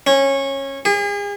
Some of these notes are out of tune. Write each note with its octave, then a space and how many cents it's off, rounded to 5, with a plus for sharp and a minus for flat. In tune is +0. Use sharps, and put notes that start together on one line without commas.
C#4 -20
G#4 -40